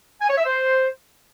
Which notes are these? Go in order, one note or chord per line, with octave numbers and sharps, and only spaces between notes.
G#5
C#5
E5
C5